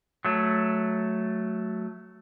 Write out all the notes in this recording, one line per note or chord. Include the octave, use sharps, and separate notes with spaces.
F#3 A3